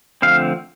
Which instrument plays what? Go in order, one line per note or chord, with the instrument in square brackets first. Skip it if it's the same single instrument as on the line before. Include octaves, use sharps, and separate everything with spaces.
[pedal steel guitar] D3 F3 A3 C4 F5